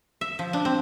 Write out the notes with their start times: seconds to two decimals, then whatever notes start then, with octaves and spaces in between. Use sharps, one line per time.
0.21 E5
0.39 F3
0.53 D4
0.65 C4